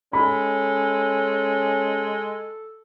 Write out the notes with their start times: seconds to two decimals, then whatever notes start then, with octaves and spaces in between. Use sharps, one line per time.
0.13 G#3 C#4 A4 B5